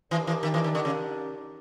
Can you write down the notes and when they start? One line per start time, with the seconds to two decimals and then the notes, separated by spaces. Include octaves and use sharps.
0.11 E3 D4 G4 A#4 D5
0.27 E3
0.43 D#3
0.54 E3
0.64 D#3
0.75 D3
0.85 C#3